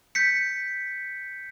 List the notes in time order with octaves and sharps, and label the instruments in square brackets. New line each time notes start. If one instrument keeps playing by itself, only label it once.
[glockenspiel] G6 B6 C#7